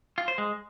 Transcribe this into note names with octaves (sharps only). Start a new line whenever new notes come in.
F4
C5
G#3